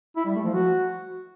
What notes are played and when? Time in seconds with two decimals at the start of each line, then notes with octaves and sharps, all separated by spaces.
0.16 E4
0.26 G3
0.35 A3
0.44 F3
0.54 F#4